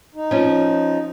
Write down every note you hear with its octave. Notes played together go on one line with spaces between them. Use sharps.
D#4
F3 C#4